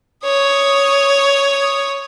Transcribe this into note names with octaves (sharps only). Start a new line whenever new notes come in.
C#5 D#6